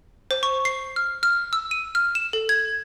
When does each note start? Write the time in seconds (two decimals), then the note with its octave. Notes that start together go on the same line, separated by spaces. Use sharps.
0.31 C5
0.43 C#6
0.65 C7
0.96 F6
1.23 F6
1.53 E6
1.71 D#7
1.95 F6
2.15 E7
2.33 A4
2.49 G#6